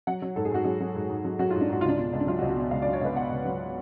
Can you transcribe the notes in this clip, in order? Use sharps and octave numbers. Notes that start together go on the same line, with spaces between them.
F#3 F#5
F#3
G#2 A4
G#4
G#2 F#4
F#3 G#4
F#3
G#2
G#2
F#3
F#3 F#4
F4
G#2
D4
G#2 F#4
C#2 F4
D4
B2 F4
C#2
D4
F#3 F4
F#4
C#2
F#4
B2 D5
C#2 F5
D5
F#3
C#5
C#2 B4
B2 F#5
C#2
F#3